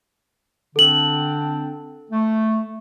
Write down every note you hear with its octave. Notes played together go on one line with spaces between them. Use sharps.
D3 C4 D4 A4 F#7
A3